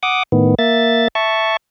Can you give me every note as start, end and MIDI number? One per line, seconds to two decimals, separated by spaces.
0.03 0.23 78
0.03 0.23 86
0.03 0.23 87
0.32 0.55 45
0.32 0.55 51
0.32 0.55 59
0.59 1.08 58
0.59 1.08 76
0.59 1.08 93
1.15 1.57 76
1.15 1.57 81
1.15 1.57 85